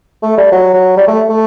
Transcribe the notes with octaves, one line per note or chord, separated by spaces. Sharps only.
A3
G3
F#3
F#3
G3
A3
A3